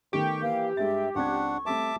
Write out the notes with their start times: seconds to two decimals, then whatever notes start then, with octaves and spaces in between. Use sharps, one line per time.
0.13 D#3 A3 B3 G4 C#6
0.42 E3 A#3 F5
0.77 G2 G#3 E5 A6
1.15 C#2 C4 D4 F#5 C#6 G#6
1.66 G3 A3 C4 E5 A5 D6